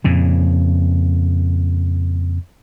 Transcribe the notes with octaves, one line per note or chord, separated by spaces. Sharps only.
F2 A#2 C#3